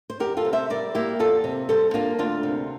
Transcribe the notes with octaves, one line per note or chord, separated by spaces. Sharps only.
C5
E2 G4 A#4
F4 A4
C3
C5 E5
G3 A#4 D5
A#3 E4 G4
E2 F4 A4
C3
G3 A4 C5
A#3 D4 F4
D2 D4 F4
C3